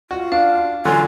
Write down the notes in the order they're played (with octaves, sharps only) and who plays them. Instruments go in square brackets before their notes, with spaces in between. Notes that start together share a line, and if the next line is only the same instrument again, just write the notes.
[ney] F4 [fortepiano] F#4
[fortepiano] D4 [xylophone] F5
[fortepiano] D3 F#3 F4 [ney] G#5